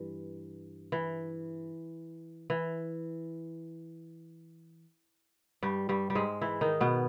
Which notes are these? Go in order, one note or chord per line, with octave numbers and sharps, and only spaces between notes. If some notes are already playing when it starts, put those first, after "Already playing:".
Already playing: G2 E3
E3
E3
G2 G3
G2 G3
G3
G#2 G#3
E3 E4
D#3 D#4
B2 B3